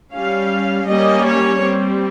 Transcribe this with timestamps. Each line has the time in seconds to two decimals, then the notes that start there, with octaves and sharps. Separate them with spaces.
0.14 G3 C#4 F5
0.88 G3 A#3 C#4 D#5
1.25 C#5
1.61 G3 C4